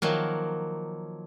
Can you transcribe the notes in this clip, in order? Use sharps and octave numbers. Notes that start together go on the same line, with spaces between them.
D#3 F3 F#3 A#3